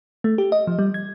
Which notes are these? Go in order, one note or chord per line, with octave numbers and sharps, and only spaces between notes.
A3
G4
D#5
F3
G3
G#6